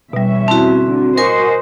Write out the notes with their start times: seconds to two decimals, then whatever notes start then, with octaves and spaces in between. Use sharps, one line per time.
0.13 E2 B2 G3 C#4 E5
0.48 C4 E4 F#4 A5
0.85 D3
1.18 F#4 A#4 C5 D#5 G#5